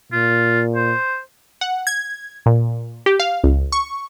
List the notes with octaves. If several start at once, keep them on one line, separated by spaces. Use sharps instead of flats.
A#2 F4
C5
F#5
G#6
A#2
G4
F5
C#2
C#6